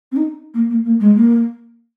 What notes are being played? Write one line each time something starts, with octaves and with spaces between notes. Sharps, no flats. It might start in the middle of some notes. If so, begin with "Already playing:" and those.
C4
D#4
A#3
A#3
A#3
G#3
A#3